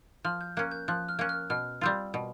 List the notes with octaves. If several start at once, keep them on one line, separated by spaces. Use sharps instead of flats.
F3 F6
G6
A#3 C#4 F#6
G6
F3 F#6
F6
A#3 C#4 F#6
F6
B2 F6
G3 C4 F4
B2